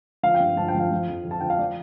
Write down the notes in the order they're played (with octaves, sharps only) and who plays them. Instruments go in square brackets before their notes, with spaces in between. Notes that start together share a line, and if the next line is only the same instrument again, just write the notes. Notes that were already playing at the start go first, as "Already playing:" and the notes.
[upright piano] F3 F5
G5
G2
F3 A5
G5
F3
F5
F3
F2
F2
A5
F3 G5
F5
F3 D5